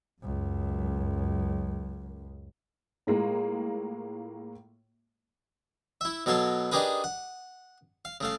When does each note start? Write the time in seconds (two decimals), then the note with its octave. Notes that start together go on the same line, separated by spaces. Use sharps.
0.24 C#2 F#2
3.07 A2 G#3 A#3 F4
6.01 E4 E5
6.26 B2 F#3 A4 C#5 F5 A5
6.72 D4 D#4 G4 G#4 A#4 B4
7.04 F#5
8.05 F5
8.21 C#3 A3 F5